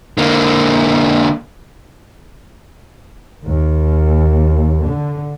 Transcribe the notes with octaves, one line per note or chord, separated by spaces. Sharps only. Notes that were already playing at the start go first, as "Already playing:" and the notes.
D3 A#3
D#2
D3